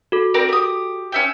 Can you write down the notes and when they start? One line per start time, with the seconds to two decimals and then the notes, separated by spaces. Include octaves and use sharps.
0.12 F#4 A4
0.34 C4 A#4 D5
0.49 G4 D#6
1.12 C#4 E5 G5